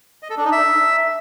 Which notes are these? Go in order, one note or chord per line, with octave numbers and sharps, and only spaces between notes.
D#5
A4
D4
D#4
E5